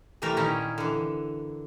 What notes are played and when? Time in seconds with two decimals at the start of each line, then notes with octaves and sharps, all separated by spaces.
0.22 C3 E3 G3 A3 A#4
0.37 A#2 D#3 C#4 E4
0.78 D3 E3